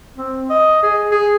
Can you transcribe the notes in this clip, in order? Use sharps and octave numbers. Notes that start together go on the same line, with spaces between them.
C4
D#5
G#4
G#4